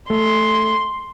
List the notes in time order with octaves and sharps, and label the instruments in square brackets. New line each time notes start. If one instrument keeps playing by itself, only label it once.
[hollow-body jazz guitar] A3 [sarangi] C6